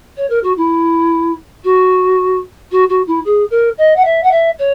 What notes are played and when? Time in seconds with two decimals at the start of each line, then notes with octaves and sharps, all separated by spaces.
0.16 C#5
0.29 A#4
0.43 F#4
0.57 E4
1.63 F#4
2.71 F#4
2.89 F#4
3.07 E4
3.24 G#4
3.50 A#4
3.78 D#5
3.95 F#5
4.04 E5
4.23 F#5
4.31 E5
4.58 C#5